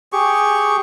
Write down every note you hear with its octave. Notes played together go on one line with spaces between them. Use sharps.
G4 G#4 C#6